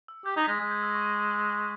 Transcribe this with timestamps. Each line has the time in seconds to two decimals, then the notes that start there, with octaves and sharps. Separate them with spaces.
0.08 E6
0.25 G4 G6
0.37 D#4 G#6
0.44 B6
0.48 G#3 A#6
0.59 G#3 G#6
0.71 G6
0.83 E6
0.95 C#6